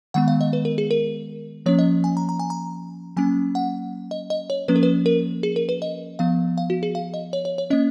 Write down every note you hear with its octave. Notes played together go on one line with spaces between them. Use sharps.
D#3 G#3 B3 F#5
F5
D#5
B4
A#4
G#4
A#4
F3 A#3 C#4 C#5
D#5
G#5
A#5
A#5
G#5
A#5
F#3 A#3 C#4 G#5
F#5
D#5
D#5
C#5
F3 A#3 C#4 B4
A#4
B4
A#4
G#4
A#4
B4
D#5
F3 B3 F5
F5
F#4
G#4
F5
D#5
C#5
C#5
C#5
A#3 C#4 D#5